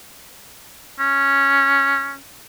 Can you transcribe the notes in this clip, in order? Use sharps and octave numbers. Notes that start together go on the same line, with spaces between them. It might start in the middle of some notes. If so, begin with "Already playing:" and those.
C#4